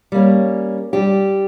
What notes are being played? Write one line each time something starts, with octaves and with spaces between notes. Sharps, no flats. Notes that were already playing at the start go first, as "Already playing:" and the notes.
G3 A#3 C#4
G3 D4 G4